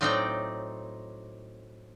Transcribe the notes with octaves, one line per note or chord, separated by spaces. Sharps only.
A2 F#3 C4 D#4 D5 G5